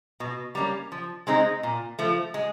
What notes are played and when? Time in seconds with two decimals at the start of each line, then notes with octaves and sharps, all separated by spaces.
0.20 B2
0.55 G3 A#3 C#4
0.92 F3
1.27 G#3 C4 D#4 G#4
1.63 A#2
1.99 F3 A3
2.34 G#3